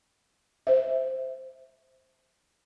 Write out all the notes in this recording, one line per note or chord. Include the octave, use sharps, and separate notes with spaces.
C5 E5